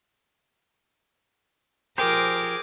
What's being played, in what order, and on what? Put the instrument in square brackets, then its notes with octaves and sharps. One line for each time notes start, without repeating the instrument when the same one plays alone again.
[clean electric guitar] F3 G4 [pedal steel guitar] G#4 C5 [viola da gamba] A#4 [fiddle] D6